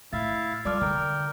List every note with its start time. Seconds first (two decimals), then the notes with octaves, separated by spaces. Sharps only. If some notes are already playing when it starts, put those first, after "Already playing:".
0.13 A2 E4 E5 F5 A6
0.65 G3 F4 A4 D5 D6 F6
0.81 D3 A#4 G5